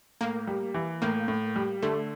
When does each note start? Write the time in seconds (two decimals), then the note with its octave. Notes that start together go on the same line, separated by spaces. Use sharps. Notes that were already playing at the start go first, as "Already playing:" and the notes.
0.21 A2 A#3
0.47 G3
0.74 E3
1.02 A2 A#3
1.28 A2
1.56 G3
1.82 D3 A3